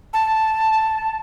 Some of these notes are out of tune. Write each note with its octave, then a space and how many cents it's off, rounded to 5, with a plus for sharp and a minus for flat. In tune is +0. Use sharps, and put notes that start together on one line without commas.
A5 +0